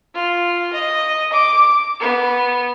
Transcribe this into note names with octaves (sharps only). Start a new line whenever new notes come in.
F4
D#5
D6
B3